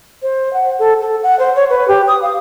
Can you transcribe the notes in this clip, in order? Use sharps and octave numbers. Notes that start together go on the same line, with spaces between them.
C5
F#5
A4
A4
F#5
C5
C#5
B4
G4
D#6
F5